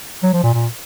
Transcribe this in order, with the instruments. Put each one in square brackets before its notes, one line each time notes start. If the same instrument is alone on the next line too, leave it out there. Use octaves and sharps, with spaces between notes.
[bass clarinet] F#3
F3
A#2
A#2